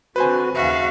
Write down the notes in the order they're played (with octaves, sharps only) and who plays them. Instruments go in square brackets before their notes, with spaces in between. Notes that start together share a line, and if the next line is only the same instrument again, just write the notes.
[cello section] D3 C4 [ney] F#4 [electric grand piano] B4 C5 G#5
[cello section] D#2 C#3 F5 [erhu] F#4 [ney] E5